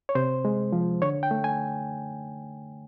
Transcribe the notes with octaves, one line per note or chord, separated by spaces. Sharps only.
C#5
C3 C5
G#3
F3
D3 C#5
G5
A3
G#5